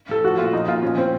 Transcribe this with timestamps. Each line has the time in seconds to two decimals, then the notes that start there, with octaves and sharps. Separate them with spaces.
0.09 A2 A4
0.24 F3 F#4
0.38 A#2 F4
0.53 F3 D#4
0.68 A#2 F4
0.83 F3 C#4
0.97 A2 C4